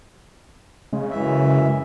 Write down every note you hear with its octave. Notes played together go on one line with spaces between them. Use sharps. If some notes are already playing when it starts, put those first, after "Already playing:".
C#3 G#3
F#2 E3 E5